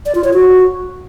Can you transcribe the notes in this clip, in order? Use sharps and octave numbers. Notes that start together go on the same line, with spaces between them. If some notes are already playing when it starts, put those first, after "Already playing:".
D5
F4
C#5
F#4